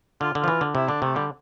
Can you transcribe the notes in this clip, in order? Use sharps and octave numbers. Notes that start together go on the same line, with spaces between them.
D3 F4
D3
F3 F4
E3
D3
C3 E4
D3 D4
C3 A3
D3 G3